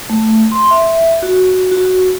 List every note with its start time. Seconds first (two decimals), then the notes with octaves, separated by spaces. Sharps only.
0.10 A3
0.52 C6
0.71 E5
1.23 F#4
1.71 F#4